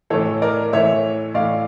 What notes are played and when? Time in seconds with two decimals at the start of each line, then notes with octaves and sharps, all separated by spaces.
0.10 A2 E3 A4 C#5
0.42 A#4 D5
0.73 A2 E3 C#5 E5
1.34 A2 E3 D5 F5